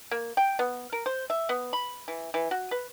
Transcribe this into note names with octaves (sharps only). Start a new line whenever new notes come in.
A#3
G5
B3
A#4
C5
E5
B3
B5
E3
E3
F#4
B4